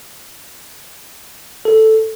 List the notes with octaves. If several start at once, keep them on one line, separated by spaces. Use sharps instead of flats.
A4